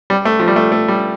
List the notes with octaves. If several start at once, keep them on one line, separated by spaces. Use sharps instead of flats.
G3
A3
F3
G3
A3
A3
G3